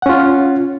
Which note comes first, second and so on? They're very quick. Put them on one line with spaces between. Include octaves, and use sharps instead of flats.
F#5 C#4 F4